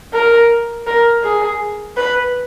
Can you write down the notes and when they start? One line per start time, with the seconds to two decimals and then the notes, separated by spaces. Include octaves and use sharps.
0.14 A#4
0.87 A#4
1.24 G#4
1.97 B4